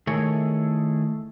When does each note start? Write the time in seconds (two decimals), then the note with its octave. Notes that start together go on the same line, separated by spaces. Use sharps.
0.07 D#3 A3 E4 G#4 A4 C#5